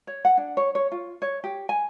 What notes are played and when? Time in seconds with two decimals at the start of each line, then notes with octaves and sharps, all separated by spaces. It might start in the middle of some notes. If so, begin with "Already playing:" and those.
0.07 C#5
0.25 F#5
0.37 D4
0.57 C#5
0.75 C#5
0.92 F4
1.22 C#5
1.44 G4
1.69 G#5